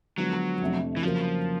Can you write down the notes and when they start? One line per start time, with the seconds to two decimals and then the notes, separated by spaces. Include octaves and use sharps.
0.18 D3 F3 F#3 G#3 B3
0.61 F2 C3 F3 A3 D4
0.96 E3
1.03 C#3 F3 F#3 A#3